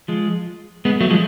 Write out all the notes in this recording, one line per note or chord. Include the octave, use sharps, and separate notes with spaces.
F3 G#3
G#3 B3
F#3 A3
F3 G#3